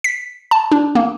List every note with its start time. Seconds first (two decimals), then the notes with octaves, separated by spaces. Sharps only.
0.04 B6
0.51 A5
0.72 D4
0.95 A#3